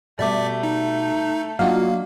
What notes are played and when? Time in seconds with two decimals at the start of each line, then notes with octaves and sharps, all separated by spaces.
0.19 B2 G3 A3 D5 E5 D6
0.63 D#4
1.59 F#3 A#3 D4 F4 F#4 D#5 F5